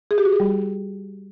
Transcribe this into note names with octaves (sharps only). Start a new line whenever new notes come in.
G#4
G4
F#4
G#4
G3